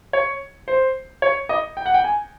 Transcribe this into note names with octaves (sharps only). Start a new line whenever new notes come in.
C#5
C5
C#5
D#5
G5
F#5
G5
G#5